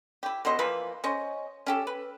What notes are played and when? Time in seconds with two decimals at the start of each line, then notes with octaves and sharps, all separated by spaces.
0.23 E4 G4
0.45 B2 E3 C5 D#5
0.59 E3 F3 A#3 B4
1.04 C#4 C5 D#5
1.66 C#4 G4 A4
1.87 B4